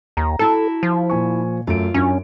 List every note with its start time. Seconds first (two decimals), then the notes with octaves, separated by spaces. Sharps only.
0.17 D#2 A#5
0.39 E4 F#4 A4 A5
0.83 F3
1.10 A#2 G#5 C#6
1.67 F#2 A3 F4 D7
1.94 F#2 C#4 D4